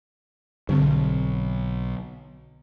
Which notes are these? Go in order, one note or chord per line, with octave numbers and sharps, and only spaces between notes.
G2 D3 C4
B1